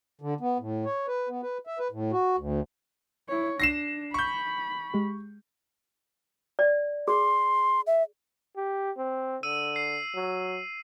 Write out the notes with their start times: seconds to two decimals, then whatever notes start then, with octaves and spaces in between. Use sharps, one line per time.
0.21 D3
0.41 B3
0.60 A2
0.85 C#5
1.08 B4
1.29 B3
1.43 B4
1.67 E5
1.79 B4
1.92 A2
2.12 F#4
2.38 D2
3.29 E4 C#5
3.60 D4 A#6 C7 E7
4.14 B5 C#6 G6
4.94 G#3 G4
6.59 D5
7.08 G#4 C6
7.87 E5
8.57 G4
8.97 C4
9.43 D3 E6 D#7
9.76 C7
10.15 F#3